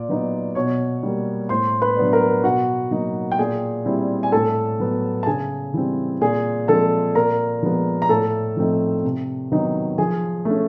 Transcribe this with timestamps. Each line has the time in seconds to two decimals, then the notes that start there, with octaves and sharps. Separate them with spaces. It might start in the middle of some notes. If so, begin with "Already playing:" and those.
Already playing: A#2 D5
0.09 F#3 B3 D#4
0.55 B2 C#5 C#6
1.03 G3 A#3
1.49 A2 C5 C6
1.82 B4 B5
1.96 F#3 B3 D4
2.13 A#4 A#5
2.44 B2 F#4 F#5
2.91 F#3 A#3 D#4
3.32 G5
3.39 A#2 G#4 G#5
3.86 G3 C4 E4
4.23 G#5
4.32 A2 A4 A5
4.80 F#3 B3
5.23 A5
5.27 C#3 G#4 G#5
5.74 E3 G3 C4
6.21 A#2 G#4 G#5
6.68 F3 G#3 C4 A4 A5
7.15 A#2 A#4 A#5
7.62 F3 G#3 B3
8.02 A#5
8.09 A2 A4 A5
8.57 F3 A3 C4 D#4
9.04 C3
9.51 D#3 F#3 B3 D#4
9.98 F3 G#4 G#5
10.45 A3 C#4